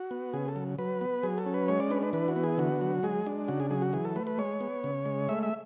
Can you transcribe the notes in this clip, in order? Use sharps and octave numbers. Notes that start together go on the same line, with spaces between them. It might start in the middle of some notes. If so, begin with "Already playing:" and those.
Already playing: F#4
B3
C#3 G#4
A4
F#3
F#3 B4
B3
F#3 G#4
A4
C#4
B4
G#3 C#5
D5
D4 B4
B4
E3 B4
F#4
B3
G#4
D3 F#4
F#3
G#3 G#4
D4
C#3 F#4
G#4
F#3 G#4
F#4
E3 G#4
A4
A3 B4
B4
G#3 C#5
B3
C#3
G#3
A3 E5
E5